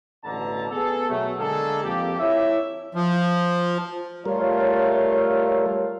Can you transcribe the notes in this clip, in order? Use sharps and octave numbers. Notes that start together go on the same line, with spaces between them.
A1 B2 D3 A5 A#5
B3 G#4 A4
B2 F#3 A3
D3 G#3 A#3 G#4 A4
F2 A#3 G4
E4 C#5 E5
F3
G3 A3 F4 A#4 C#5